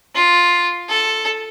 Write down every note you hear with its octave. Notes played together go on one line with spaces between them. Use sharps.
F4
A4